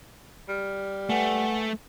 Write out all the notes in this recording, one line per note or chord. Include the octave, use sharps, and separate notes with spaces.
G3 F6
A3 B4 F#5 G#5